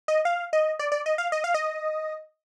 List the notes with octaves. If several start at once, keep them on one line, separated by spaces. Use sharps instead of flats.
D#5
F5
D#5
D5
D5
D#5
F5
D#5
F5
D#5